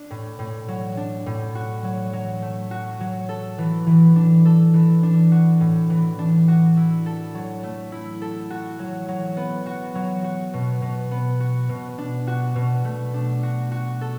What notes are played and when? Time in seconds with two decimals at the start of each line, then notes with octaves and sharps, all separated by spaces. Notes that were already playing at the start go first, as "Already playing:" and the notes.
Already playing: D4
0.10 A2
0.39 A2
0.68 F#3
0.97 D4
1.26 A2
1.55 F#4
1.84 F#3
2.13 F#3
2.42 A3
2.71 F#4
3.00 F#3
3.29 A4
3.58 E3
3.87 E3
4.16 D4
4.45 A4
4.74 E3
5.03 D4
5.32 F#4
5.60 A2
5.90 E3
6.19 D4
6.48 F#4
6.77 E4
7.06 A4
7.35 F#3
7.63 A3
7.92 E4
8.22 A4
8.50 F#4
8.79 F#3
9.08 F#3
9.37 B3
9.66 F#4
9.95 F#3
10.24 F#4
10.53 B2
10.82 B2
11.11 B3
11.40 F#4
11.69 B2
11.98 D4
12.27 F#4
12.56 B2
12.85 A3
13.14 D4
13.43 F#4
13.71 F#4
14.01 A4